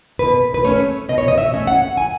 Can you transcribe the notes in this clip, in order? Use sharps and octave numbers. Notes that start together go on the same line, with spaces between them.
B2 B4
B4
A3 C#4 C#5
B2 D#5
C#5
D#5
E5
A3 C#4
F#5
G#5